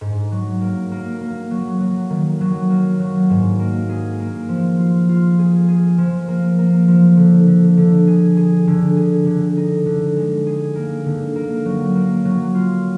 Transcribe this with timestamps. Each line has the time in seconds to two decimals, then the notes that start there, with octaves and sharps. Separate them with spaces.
0.01 G#2
0.32 F#3
0.61 A#3
0.92 A#3
1.21 A#3
1.51 F#3
1.81 F#3
2.10 D#3
2.41 F#3
2.70 A#3
3.00 F#3
3.30 G#2
3.59 A#3
3.90 G#4
4.20 A#3
4.49 F3
4.79 F4
5.09 F4
5.39 G#4
5.68 G#4
5.98 F3
6.28 A#3
6.59 A#3
6.88 F3
7.17 D3
7.48 D3
7.77 D3
8.07 G#4
8.37 G#4
8.67 D3
8.96 G#4
9.27 D3
9.57 D#4
9.86 D3
10.16 G#3
10.47 G#4
10.76 A#3
11.06 D3
11.36 A#3
11.66 F#3
11.95 A#3
12.25 F#3
12.55 F4